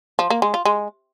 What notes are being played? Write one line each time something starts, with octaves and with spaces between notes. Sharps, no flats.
F3
A#3
G#3
F4
G#3